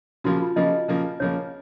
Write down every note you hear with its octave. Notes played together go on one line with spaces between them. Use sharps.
C#3 F3 A#3 F#4
F4
C#3 F3 A#3 D#5
C#3 F3 A#3
C#3 F3 A#3 C#5